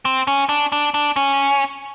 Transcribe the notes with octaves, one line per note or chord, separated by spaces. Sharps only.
C4
C#4
D4
D4
D4
C#4